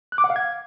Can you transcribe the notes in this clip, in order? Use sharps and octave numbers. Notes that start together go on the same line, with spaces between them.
F#6
D6
F#5
F5
G#6